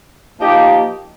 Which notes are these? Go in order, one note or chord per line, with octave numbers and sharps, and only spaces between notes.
F3 A#3 D#4 G4